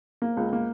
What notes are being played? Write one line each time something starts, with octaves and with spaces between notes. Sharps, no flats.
A#3
C#2
A#3